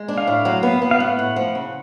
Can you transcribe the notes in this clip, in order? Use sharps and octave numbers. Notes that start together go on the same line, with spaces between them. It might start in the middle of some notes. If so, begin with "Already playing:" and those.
Already playing: G#3
D4
F5
A2
F#3
B3
B3
F5
A2 F#5
A2
F3
C#3